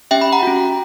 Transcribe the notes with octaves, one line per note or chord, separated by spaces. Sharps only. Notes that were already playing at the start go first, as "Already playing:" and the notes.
C#4 G4 E5 G5
G5 B5
F#5 A#5
C#4 F#4